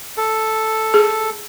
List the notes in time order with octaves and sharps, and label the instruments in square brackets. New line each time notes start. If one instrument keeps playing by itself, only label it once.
[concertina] A4
[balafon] G#4